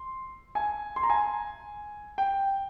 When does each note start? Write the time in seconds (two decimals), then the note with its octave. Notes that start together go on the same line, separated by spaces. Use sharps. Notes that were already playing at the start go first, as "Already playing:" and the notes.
Already playing: C6
0.55 G#5
0.96 C6
1.03 A#5
1.10 G#5
2.18 G5